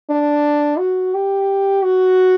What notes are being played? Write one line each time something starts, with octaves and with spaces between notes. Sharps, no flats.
D4
F#4
G4
F#4